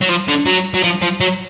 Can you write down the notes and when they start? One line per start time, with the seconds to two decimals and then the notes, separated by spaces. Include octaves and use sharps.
0.02 F#3
0.09 F3
0.28 D3
0.46 F#3
0.74 F#3
0.84 F3
1.02 F3
1.21 F#3